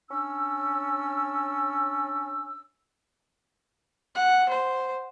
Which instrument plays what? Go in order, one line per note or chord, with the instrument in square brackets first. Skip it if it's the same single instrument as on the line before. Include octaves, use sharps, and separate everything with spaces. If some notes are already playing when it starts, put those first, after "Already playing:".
[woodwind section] C#4 D4 E6
[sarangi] F#5
C5